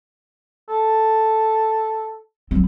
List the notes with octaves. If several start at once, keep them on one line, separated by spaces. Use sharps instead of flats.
A4
F#3 C4